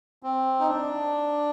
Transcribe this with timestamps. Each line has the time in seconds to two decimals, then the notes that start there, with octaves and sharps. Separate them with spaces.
0.23 C4
0.60 D#4
0.68 D4